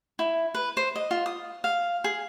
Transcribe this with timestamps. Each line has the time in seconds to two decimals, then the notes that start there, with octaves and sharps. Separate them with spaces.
0.19 E4
0.54 B4
0.77 C5
0.96 D#5
1.11 F4
1.26 D#6
1.64 F5
2.04 G#4